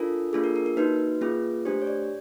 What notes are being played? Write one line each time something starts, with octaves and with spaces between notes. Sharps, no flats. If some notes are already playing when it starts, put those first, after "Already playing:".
Already playing: D4 F4 A4 A#4
A#3 D4 F4 G#4 A4
A#4
A#4
A#4
A#3 D#4 F#4 B4
A#3 C#4 F4 G#4
A3 D4 G4 C5
C#5
D5